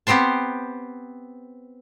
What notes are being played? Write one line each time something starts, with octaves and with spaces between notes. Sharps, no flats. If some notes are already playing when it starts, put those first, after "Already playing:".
B3 C4 G4 C5 A5